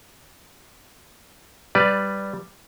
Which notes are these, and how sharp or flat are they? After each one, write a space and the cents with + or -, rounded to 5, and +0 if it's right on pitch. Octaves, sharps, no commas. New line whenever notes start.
G3 +0 B4 +0 D5 +0